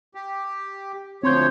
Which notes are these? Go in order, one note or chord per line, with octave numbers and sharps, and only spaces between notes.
G4
D2 F3 C4 C#5 C6 G6